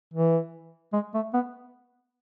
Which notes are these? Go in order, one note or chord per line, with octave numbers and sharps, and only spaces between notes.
E3
G#3
A3
B3